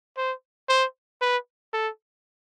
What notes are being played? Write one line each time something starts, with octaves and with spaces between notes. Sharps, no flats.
C5
C5
B4
A4